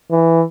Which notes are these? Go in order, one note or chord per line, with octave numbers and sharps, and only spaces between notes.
E3